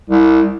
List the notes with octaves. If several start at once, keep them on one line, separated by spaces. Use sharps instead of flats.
C2